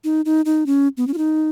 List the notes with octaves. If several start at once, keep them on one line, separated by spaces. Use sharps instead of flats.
D#4
D#4
D#4
C#4
B3
C#4
F4
D#4